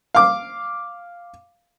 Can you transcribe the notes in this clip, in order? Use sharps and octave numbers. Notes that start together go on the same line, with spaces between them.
F5 D6